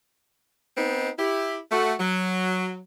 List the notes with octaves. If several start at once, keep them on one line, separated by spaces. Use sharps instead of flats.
B3 C4 D#4
E4 G4
A3 F#4
F#3